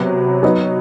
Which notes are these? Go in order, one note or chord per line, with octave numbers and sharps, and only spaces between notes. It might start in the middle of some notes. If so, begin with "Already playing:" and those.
Already playing: C3 F#3 B3
F#3 B3 D#4